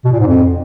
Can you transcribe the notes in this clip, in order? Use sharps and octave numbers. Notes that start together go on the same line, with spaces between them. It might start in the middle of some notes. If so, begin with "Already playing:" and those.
B2
A#2
G#2
F2